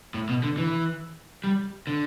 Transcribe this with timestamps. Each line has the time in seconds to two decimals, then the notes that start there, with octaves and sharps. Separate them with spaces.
0.14 A2
0.29 B2
0.43 D3
0.57 E3
1.44 G3
1.87 D3